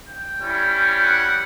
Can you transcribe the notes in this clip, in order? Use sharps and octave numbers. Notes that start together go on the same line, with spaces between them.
G5
G3 C#4 E4
F#5